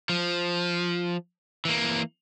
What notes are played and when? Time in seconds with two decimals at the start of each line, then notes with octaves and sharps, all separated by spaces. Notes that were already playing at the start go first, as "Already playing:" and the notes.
0.10 F3
1.65 E3 A#3